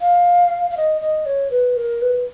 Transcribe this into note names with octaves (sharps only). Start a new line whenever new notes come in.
F5
F5
D#5
D#5
C#5
B4
A#4
B4